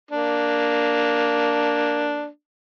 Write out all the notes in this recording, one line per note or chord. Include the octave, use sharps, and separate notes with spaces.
A#3 D4